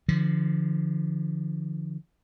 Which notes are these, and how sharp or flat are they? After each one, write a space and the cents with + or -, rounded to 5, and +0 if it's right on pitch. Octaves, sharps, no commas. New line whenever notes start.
D3 +20 F3 -20